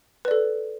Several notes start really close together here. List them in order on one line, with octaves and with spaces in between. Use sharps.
B4 D5 A4